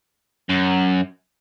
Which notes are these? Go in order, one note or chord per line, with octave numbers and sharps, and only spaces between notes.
F#2